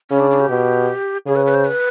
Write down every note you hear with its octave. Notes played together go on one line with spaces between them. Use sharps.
C#3 C#4
D4
D4
G4
B2
C#3 G#4
B4
B4
C5
B4